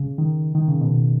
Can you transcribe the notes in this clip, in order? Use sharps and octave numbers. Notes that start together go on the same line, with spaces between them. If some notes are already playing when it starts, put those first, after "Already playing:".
Already playing: C#3
D#3
D#3
C#3
B2